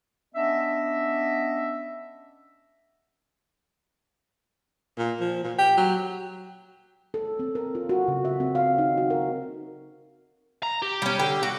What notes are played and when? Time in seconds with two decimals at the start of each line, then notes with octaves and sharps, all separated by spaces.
0.35 B3 C#4 D4 D#5 E5
4.98 A#2
5.21 F3
5.44 A#2
5.58 G4
5.77 F#3
7.14 A4
7.39 C4
7.55 A#4
7.75 F4
7.89 F#4
8.08 C#3
8.25 E5
8.40 C4
8.55 F5
8.78 D#4
8.98 F#4
9.10 A#4
10.63 A#5
10.82 G4
11.02 G3 C#4
11.19 D3 G5
11.43 F#4